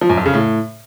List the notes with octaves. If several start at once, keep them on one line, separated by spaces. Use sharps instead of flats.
F3
F#2
F2
C#3
A2